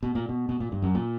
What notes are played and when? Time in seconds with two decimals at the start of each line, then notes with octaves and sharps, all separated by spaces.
0.03 B2
0.15 A#2
0.29 B2
0.49 B2
0.60 A#2
0.72 G2
0.82 F#2
0.95 A#2